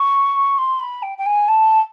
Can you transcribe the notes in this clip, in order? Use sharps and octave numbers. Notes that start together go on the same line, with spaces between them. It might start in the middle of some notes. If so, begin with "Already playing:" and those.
Already playing: C#6
C6
B5
G5
G5
G#5
A5